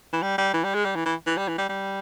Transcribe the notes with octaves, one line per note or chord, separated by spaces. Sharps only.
E3
G3
G3
E3
G3
G#3
G3
E3
E3
E3
G3
E3
G3
G3